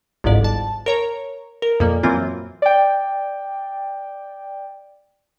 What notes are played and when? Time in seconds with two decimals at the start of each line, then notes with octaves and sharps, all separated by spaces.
0.24 G1 C2 F2 G#2 D5
0.44 A5
0.86 A#4 C#5 A#5
1.62 A#4
1.80 F2 A#2 A#3
2.03 F#2 E3 A#3 C4 F4
2.62 D5 G5